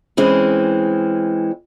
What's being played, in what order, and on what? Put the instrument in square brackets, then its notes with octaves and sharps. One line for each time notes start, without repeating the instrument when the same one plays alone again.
[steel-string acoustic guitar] E3 G#3 C4 C#4